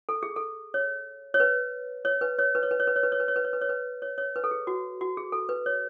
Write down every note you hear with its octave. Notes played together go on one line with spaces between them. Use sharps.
A4
G#4
A4
C#5
C#5
B4
C#5
B4
C#5
B4
C#5
B4
C#5
B4
C#5
B4
C#5
B4
C#5
B4
C#5
B4
C#5
B4
C#5
C#5
B4
A4
G#4
F#4
F#4
G#4
A4
B4
C#5